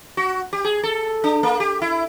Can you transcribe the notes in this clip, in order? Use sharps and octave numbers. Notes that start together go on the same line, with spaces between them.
F#4
G4
G#4
A4
D4
A#3
G4
E4